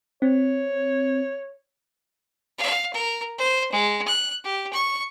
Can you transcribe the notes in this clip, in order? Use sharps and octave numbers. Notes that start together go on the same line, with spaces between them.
C4 C#5
F5
A#4
C5
G#3
F#6
G4
C#6